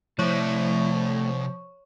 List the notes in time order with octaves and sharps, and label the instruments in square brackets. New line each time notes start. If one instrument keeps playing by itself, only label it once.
[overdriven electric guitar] A2 A3 [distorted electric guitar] C3 D5 [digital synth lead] F3 [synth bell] C#5 C#6